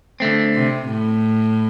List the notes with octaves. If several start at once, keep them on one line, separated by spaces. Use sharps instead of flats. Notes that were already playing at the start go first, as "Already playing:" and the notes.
D3 A3 C4
C3
A2